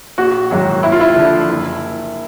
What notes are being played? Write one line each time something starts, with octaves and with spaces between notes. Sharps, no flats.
A#1 F#4
G#2 D#3 F#3
D#2 E4
F4
E4
D3 F3
F#1